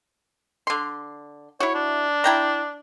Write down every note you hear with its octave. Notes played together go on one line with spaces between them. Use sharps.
D3 C6
E4 F#4 C#5
D4
E4 G5 A#5